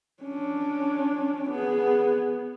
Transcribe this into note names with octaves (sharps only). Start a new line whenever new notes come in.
C#4 D4
B3 G#4